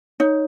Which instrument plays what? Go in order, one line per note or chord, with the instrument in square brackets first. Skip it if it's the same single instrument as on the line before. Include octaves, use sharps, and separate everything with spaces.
[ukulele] D#4 [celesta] C#5